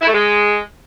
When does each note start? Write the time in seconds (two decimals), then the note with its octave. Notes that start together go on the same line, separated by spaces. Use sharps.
0.02 E4
0.07 A3
0.13 G#3